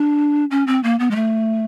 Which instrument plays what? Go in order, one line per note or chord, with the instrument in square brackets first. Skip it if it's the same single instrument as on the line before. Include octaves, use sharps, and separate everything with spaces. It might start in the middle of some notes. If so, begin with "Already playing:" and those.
Already playing: [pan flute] D4
C#4
C4
A#3
B3
G#3
A3